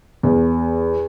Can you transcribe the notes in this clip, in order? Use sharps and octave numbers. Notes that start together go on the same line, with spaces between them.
E2